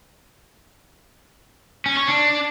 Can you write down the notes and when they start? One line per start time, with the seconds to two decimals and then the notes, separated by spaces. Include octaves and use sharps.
1.86 C#4
1.97 C#5
2.08 D4